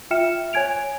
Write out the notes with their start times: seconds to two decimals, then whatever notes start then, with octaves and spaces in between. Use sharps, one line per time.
0.11 F4 E5 G5 F6 C#7 E7
0.53 C#5 G#5 G#6 D7 F7